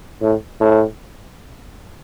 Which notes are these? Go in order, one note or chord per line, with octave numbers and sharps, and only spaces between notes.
A2
A2